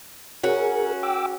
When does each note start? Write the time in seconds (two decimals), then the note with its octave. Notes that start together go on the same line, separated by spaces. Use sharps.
0.44 C#4 F#4 G#4 A#4
1.03 G5 D6 E6